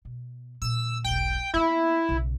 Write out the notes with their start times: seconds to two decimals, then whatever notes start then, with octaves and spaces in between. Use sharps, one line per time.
0.05 B2
0.62 A#2 D3 E6
1.04 E1 B1 G5
1.54 A#3 B3 E4
2.09 B1 C#3